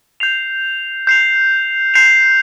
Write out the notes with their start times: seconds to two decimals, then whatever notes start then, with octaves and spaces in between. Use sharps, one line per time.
0.20 G6 C7 F7
1.07 G6 C7 F7
1.94 G6 C7 F7